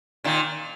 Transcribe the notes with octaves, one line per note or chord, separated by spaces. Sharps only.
A#2 D#3